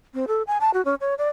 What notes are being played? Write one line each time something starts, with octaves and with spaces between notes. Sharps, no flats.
C4
A4
G#5
A5
F#4
C#4
C#5
D5